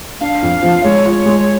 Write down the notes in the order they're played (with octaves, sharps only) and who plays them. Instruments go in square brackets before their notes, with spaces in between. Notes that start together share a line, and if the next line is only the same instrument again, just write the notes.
[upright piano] D4 [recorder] F5
[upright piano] F2
F3
[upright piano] G#3 [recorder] C#5
[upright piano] F4
G#3